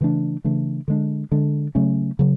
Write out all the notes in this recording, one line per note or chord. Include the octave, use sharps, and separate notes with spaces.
C#3 E3 A3 D4
C#3 E3 A3 D4
D3 G#3 D4
D3 G#3 D4
C#3 F#3 A3 C#4
C#3 F#3